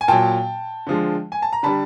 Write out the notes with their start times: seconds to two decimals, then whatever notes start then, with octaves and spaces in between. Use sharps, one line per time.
0.01 G#5
0.08 A#2 F#3 G5 A5
0.87 D3 F3 G#3
1.32 G#5
1.42 A5
1.53 A#5
1.63 D3 G3 A5 B5